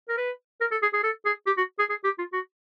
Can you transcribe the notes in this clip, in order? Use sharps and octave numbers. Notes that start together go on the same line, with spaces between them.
A#4
B4
A#4
A4
G#4
G#4
A4
G#4
G4
F#4
G#4
G#4
G4
F4
F#4